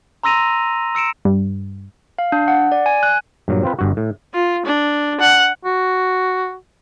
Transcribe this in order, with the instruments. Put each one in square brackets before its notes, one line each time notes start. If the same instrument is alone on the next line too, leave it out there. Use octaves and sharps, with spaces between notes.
[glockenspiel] A#5 C6 E6 A#6 D#7 F7
E6 C#7 D7 E7
[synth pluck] G2
[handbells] F5
D4
F#5
D5
G#5
F#6
[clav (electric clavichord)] G2 A#2 F#3
C4 F4 B4
G1 G2 F#4
A2
[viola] F4
D4
F#5
[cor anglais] F#4